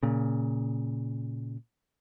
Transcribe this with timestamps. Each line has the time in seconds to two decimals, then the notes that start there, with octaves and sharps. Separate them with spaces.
0.03 A#2 C#3